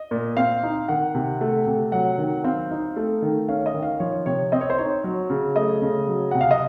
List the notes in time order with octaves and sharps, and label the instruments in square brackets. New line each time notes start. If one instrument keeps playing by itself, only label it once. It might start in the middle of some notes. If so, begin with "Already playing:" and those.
Already playing: [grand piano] D#5
A#2
C4 F5
D#4
D#3 F#5
C3
A3
C3
F#3 F#5
D#3
C4 F5
D#4
A3
D#3
C#4 F5
D#5
D#3
F5
F3 C#5
C3 C#5
C4 D#5
C#5
C5
D#4 C#5
F#3
C#3
A3 D#5
C#3
F#3
C3 F#5
F5
D#5